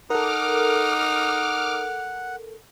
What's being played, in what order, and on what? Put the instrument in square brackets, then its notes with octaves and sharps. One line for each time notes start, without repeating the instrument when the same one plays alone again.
[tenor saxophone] D#4 [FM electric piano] A4 A#4 [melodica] F#5 [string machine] D6 F6